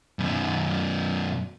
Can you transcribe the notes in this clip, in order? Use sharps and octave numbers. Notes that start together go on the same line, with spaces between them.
F#2 B2